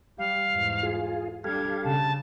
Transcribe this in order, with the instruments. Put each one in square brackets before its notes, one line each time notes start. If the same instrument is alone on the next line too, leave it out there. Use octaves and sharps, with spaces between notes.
[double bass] G3 [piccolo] F5
[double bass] E2 G#2
[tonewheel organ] F4 G#4
[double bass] G3 D4 [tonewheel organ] G4 A4 F5 [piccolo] G#6
[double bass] C#3 [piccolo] A5